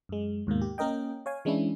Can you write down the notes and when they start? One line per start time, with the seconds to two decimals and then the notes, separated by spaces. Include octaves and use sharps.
0.09 F#2 G#3
0.47 D#2 G#2 B2 A#3
0.61 G4
0.78 A#3 C#4 A#4 D#5 G5
1.26 C#5 F5 G#5
1.45 E3 G#3 C#4 D4 E4